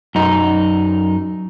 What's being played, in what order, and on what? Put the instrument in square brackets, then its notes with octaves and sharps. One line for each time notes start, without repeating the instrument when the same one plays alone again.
[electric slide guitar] F#2 D#4